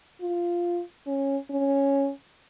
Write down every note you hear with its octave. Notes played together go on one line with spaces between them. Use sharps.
F4
C#4
C#4